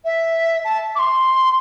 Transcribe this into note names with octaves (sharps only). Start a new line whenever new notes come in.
E5
A5
D6
C6